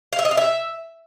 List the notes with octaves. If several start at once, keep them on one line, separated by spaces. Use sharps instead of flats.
F5
E5
D#5
F5
E5